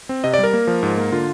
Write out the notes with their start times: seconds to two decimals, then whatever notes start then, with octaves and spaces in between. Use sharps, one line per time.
0.09 C4
0.24 C3 D#5
0.34 G3 D5
0.44 A#4
0.53 A#3
0.67 F3
0.83 G#2
0.97 A#3
1.12 D3 F4